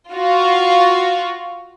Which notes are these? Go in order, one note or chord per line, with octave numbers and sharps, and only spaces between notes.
F4 F#4